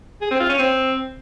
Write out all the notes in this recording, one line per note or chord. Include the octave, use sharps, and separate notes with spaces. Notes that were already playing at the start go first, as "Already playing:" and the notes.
G#4
C4
F4
C#4
C4